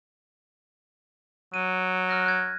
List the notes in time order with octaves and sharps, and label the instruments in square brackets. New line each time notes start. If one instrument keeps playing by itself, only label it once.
[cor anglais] F#3 [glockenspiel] D#7
[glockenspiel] F6 F#6 A#6
F#6 G#6